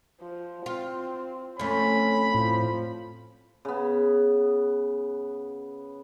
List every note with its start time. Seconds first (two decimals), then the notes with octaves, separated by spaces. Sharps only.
0.21 F3
0.66 C4 F4
1.59 F2 A3 C#4 B5
2.34 A2 F3
3.65 C#3 B3